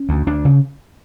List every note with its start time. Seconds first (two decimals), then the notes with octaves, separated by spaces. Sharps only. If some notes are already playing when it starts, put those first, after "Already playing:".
Already playing: C#4
0.09 D2
0.27 D2 D4
0.45 C#3